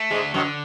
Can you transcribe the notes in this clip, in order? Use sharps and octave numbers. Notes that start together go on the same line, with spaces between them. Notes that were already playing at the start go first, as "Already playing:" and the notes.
Already playing: A3
G#2 D3 G#3
F#2 D3 F#3